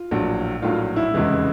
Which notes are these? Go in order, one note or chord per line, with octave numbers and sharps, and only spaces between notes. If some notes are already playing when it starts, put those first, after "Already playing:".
Already playing: F4
A#1 A2 F#3
A#1 A2 F#3 F4
E4
F1 E2 C#3 E3 G#3